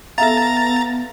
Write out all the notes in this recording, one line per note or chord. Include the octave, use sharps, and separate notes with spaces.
B3 A4 E5 F5 A#5 A6